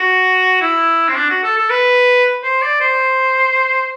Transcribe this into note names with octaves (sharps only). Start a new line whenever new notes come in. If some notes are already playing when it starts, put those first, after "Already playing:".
Already playing: F#4
E4
C4
D4
F#4
A4
A4
B4
C5
D5
C5